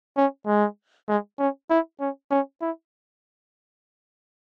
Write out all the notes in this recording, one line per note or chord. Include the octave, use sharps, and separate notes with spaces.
C#4
G#3
G#3
C#4
E4
C#4
C#4
E4